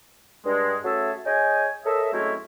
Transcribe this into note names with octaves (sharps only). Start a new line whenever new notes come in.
G2 G#3
A3 C#4 F#4 G#4 A4 E5
G#4 C#5 D#5 G5 G#5
A4 A#4 C#5 D#5 E5
F#3 G#3 A3 C4 C#4 E4